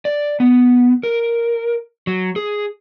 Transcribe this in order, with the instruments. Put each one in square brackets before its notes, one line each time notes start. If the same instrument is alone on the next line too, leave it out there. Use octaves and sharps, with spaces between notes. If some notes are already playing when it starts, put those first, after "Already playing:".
[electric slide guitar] D5
B3
A#4
F#3
G#4